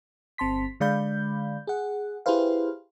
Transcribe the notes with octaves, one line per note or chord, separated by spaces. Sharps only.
G1 C4 A5 C6 B6
D3 G#3 D5 F5 B5 G6
G#4 F#5
E4 G4 G#4 B4 C5 F5